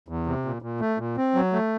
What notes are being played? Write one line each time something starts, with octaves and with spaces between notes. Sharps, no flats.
E2
C3
A#2
A#2
A3
A#2
C4
F#3
A3